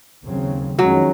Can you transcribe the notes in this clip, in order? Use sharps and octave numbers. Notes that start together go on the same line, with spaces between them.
D#2 C#3 F#3 C4
F2 D#3 F#3 G#3 C#4